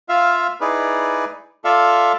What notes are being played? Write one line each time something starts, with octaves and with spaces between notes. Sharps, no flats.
F4 E5 F5
D#4 E4 G#4 B4 D5
F4 A4 D5 E5 F5